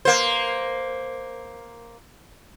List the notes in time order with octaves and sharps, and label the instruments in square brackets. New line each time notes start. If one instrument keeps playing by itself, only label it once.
[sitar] A#3 C5